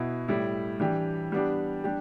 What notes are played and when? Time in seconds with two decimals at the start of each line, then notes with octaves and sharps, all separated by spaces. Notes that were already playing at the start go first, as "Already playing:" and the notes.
Already playing: B2 B3 E4
0.28 A2 G3 E4
0.80 E3 G3 D4 G4
1.32 G3 B3 D4 G4
1.84 G3 D4 G4